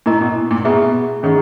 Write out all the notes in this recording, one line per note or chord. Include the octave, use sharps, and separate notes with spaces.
A#2 E4 A#4 D#5 A#5 C#6
B2
A#2
B2 G#4 B4 E5 A#5
D#3 C#4 G#4 C#5 F#5 C#6